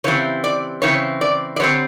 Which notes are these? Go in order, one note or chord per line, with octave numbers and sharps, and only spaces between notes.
C#3 E3 G3 C4 C#5
D5
C#3 E3 C4 C#5
D5
D5
D3 G3 C4 C#5